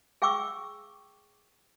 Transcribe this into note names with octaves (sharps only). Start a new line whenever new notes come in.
G#4 F5 G5 C#6 D6 E6